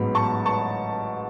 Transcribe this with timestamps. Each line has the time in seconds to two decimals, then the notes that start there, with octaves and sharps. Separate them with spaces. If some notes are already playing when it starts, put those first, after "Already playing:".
Already playing: A1 G#2 F#3 B3 B5
0.15 A5 C#6
0.46 A5 C#6